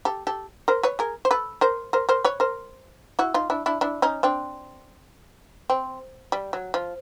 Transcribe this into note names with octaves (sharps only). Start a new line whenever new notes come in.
G4 A4
G4 A4
A#4 C5
B4 C#5
G#4 A#4
C5
A4 B4
A#4 C5
A#4 C5
A#4 C5
B4 C#5
A#4 C5
E4 F#4
D#4 F4
D4 E4
D4 E4
D4 E4
C#4 D#4
C4 D4
C4
G3
F#3
F3